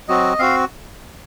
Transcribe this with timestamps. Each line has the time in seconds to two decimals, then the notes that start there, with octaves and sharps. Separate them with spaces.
0.08 F#3 C4 F#4 D#5
0.39 C4 F#4 F5